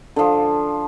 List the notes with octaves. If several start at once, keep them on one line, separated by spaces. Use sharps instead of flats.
D3 F3